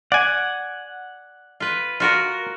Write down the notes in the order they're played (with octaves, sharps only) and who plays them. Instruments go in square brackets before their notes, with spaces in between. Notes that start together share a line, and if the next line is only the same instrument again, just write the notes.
[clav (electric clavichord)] D5 G#5 [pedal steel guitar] F#5
[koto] F4 B4
F4 F#4 A#4